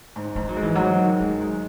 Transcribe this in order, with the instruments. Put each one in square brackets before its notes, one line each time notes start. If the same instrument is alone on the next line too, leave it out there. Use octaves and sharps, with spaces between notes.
[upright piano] G#2
[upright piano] G#2 [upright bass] G#3
[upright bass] F#3
[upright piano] G#3
[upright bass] E3
[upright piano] G#2 [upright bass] F#3
[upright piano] D#3
[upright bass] F#3 [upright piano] G#3
[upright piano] G#3